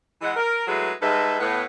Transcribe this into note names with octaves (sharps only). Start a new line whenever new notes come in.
E3 G#3 F#5
A#4
F#3 G#3 A3 E4 G#4 B4
G#2 G3 G#3 A4 B4 E5
A2 B3